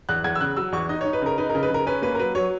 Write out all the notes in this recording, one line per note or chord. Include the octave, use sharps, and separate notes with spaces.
E2 F#6
E2 G#6
E6
C#3 F#6
F#3 E6
E2 C#6
D#4 D#5
C#5
D#4
B4
C#3 A#4
D#4 B4
A#4
C#3
B4
C#3 A#4
C#4 B4
A#3 B4
A#4
F#3 B4
F#3 C#5